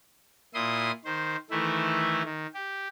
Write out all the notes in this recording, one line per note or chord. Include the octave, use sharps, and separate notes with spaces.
A#2 E4 C6 D#6
D#3 C5
D#3 E3 A3 E4
D#3
G4